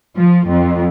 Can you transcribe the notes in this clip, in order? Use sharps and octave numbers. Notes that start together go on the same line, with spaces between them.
F3
F2